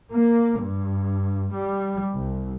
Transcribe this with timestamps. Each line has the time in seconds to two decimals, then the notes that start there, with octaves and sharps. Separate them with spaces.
0.12 A#3
0.62 G2
1.53 G3
2.14 C2